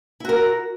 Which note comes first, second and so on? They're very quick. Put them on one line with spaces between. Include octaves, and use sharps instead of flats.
E4 F#4 A#4